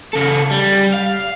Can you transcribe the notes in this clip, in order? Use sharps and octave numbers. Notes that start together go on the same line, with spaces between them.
C#3 A4
G3
F5